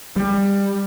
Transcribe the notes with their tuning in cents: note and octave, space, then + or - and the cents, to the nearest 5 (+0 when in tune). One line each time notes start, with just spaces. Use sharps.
G3 +20